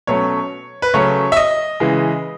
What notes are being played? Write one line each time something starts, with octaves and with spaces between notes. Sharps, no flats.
B2 F#3 A3 C#4 C#5
B4
C#3 F#3 A3 C#4 C#5
E5
D#5
C#3 E3 G#3